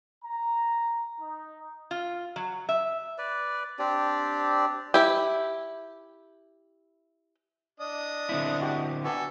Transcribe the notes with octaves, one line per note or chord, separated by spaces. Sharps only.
A#5
D#4
F4
F#3
E5
B4 D5
C4 D4 G4 D5
E4 G4
D4 D#5 D#6
D3 C4 E4
F#4 G4
B3 D4 F#4 A4 G#5